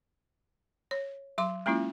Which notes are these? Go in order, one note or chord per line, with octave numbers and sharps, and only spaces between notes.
C#5
F#3 C6 D6
G#3 A#3 C#4 E4 F4